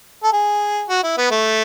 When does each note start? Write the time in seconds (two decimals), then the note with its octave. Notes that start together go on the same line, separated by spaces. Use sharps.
0.23 A4
0.33 G#4
0.89 F#4
1.03 E4
1.17 B3
1.31 A3